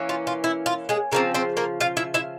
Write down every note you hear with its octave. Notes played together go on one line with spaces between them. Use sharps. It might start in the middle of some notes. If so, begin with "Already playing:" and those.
Already playing: E3 A#3 C#4
F4
F4
E4
F4
G#3 G#4
C#3 F3 A#3 C4 A#4
C4 C5
A#3 A#4
F4 F5
E4 E5
E4 E5